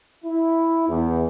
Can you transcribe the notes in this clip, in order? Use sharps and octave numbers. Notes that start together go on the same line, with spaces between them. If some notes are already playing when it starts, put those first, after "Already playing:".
E4
E2